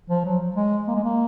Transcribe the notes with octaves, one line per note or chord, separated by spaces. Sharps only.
F3
F#3
G#3
A#3
G#3
A#3